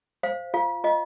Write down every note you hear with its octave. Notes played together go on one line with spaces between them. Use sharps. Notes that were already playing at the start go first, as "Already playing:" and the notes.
C5 F5
F4 F5
F4 D#5